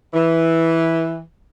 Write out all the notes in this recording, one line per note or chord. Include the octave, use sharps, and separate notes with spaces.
E3